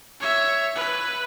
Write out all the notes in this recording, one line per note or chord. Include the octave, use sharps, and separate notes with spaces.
C#5 E5
B4